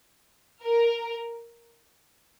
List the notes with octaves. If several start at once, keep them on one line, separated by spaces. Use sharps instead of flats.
A#4